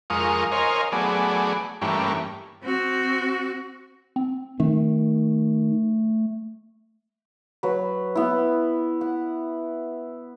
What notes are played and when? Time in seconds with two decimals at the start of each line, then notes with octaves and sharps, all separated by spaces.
0.10 F2 G#3 A#4 F5 C#6 D#6
0.52 A#4 C5 C#5 D#5 F5 G#5
0.92 F#3 A3 B3 G#4 D5
1.82 G2 E3 G3 A3 A#3 C#4
2.63 C4 F#4
4.16 C4
4.60 D#3 A3
7.63 F#3 B4
8.15 B3 E4
9.01 F#5